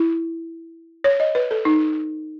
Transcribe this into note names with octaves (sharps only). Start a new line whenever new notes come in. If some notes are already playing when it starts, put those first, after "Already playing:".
Already playing: E4
C#5
D#5
B4
A4
D#4